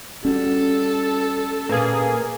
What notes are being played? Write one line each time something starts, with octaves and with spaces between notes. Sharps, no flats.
G3 C#4 F#4 A4
A#2 A#3 G#4 B4